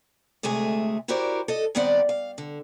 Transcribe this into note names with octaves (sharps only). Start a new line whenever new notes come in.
D2 C3 G#3 A3 G#4 E5
E4 F#4 G4 A#4 C5 D5
A4 D#5
G2 D#3 B3 C4 D5 F#5
F5
D3